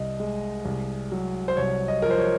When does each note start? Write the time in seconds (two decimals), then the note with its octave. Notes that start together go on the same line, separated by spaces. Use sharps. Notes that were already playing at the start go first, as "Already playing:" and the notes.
Already playing: C2 D#5
0.20 G#3
0.65 C2
1.12 F#3
1.48 C5
1.57 C2 C#5
1.88 D#5
2.02 F3 A#4
2.11 C5
2.19 C#5